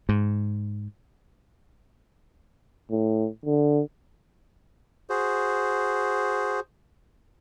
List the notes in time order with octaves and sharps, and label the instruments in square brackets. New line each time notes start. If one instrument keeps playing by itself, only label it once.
[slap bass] G#2
[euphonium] A2
D3
[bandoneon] F#4 G#4 C5